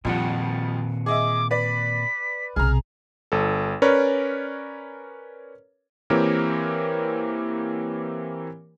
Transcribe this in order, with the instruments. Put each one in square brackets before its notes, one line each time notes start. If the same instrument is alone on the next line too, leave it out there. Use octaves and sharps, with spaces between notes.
[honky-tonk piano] F2 F3 G3 [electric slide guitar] A#2 C4 F#5 [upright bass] D#3
[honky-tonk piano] G#4 D#5 E5 [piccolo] D6
[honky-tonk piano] B4 D5 [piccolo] B6
[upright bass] B1 C3 [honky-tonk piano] G#4 A#5 [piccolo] F6
[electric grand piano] G1 A4
C#4 A#4 B4 C#5 D5
E3 A#3 C4 G4 A#4 C#5